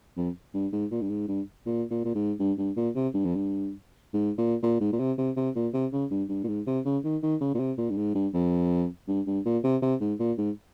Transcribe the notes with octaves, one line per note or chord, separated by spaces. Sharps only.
F2
G2
G#2
A#2
G2
G#2
G2
A#2
A#2
A#2
G#2
G2
G2
A#2
C3
G2
F2
G2
G#2
A#2
A#2
G#2
A#2
C3
C3
C3
A#2
C3
C#3
G2
G2
A#2
G#2
C3
C#3
D#3
D#3
C#3
A#2
C3
A#2
G2
G#2
G2
F2
G2
G2
A#2
C3
C3
G#2
A#2
G#2